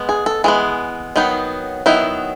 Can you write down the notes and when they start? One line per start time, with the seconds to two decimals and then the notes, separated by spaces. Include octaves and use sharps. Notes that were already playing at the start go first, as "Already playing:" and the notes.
Already playing: G#3 B3
0.09 G#4
0.26 A4
0.44 E3 G#3 B3 G#4
1.16 D#3 F#3 B3 D#4
1.86 D#3 F#3 B3 D#4 E4